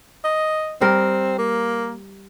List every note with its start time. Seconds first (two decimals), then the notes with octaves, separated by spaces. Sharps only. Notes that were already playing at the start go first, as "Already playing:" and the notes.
0.25 D#5
0.81 G3 C4 A#4
1.38 A#3